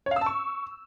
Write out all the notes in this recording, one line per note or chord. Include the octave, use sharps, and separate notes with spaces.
C#5
F5
E6
A5
C#6